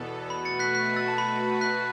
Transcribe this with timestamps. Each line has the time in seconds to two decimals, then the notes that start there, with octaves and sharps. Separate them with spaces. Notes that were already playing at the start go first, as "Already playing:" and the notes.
Already playing: E2 B2 B3 A4
0.30 B2 A3 F#4 B4 B5
0.45 A6 C#7
0.59 F#6 B6
0.74 F#6 B6
0.86 B6
0.96 E6 A6
1.08 A5
1.18 B5
1.61 F#6 B6